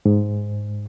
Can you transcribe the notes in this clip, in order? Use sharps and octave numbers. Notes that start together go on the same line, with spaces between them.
G#2